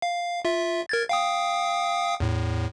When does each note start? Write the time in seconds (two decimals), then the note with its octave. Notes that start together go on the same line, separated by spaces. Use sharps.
0.02 F5
0.45 F4 E5
0.89 A#4 G#6 A6
1.09 F5 G5 D#6
2.20 E2 A2